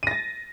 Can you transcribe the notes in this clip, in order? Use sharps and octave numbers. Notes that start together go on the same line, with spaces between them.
A6 A#6 D#7